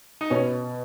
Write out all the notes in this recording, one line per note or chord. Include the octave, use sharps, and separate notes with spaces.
D#4
B2 C#4